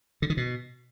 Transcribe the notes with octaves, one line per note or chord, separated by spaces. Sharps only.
D3
D#3
B2